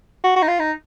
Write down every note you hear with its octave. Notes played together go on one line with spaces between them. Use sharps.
F#4
F#4
D#4
F4
D#4